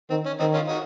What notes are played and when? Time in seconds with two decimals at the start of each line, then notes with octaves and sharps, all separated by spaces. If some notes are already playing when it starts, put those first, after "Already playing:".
0.10 D#3 C4
0.26 C#4
0.40 D#3 C4 D#4
0.54 C#4 F4
0.68 D#4 F#4